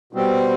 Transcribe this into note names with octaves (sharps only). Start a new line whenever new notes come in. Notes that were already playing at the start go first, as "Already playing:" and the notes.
B2 G3 C4